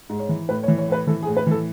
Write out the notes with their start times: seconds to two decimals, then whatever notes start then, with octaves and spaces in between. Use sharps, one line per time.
0.09 G#2
0.19 C#5
0.29 E3
0.49 A2 B4
0.63 C#5
0.68 E3
0.78 C#5
0.88 A2 B4
1.07 E3 A4
1.23 G#4
1.27 A2
1.37 B4
1.47 E3 A4